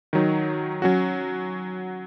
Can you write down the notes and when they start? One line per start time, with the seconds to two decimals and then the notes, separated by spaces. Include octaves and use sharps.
0.13 D#3 F#3 D#4
0.82 F#3 C#4 F#4